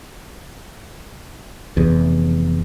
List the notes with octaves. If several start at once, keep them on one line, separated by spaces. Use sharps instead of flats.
F1 E2